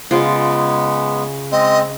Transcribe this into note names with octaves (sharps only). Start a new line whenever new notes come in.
C#3 G#3 B3 F4
G#3 C4 D#5